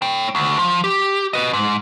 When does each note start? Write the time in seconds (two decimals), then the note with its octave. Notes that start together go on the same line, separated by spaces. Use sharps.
0.02 C#5 G5
0.35 D2
0.59 F3
0.84 G4
1.33 B4 D#5
1.53 G#2